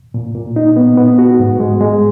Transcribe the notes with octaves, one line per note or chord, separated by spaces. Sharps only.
A#2
A#2
D#4
B3
B3
F#4
G#2
G#3
G#3